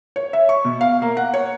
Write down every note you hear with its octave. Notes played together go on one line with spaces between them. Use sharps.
C#5
E5
C#6
B2
F5
A#3
F#5
C#5